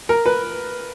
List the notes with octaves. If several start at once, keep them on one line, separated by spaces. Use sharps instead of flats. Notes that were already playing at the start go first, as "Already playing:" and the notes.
A#4
B4